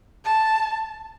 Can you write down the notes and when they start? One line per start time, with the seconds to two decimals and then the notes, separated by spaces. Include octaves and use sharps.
0.25 A5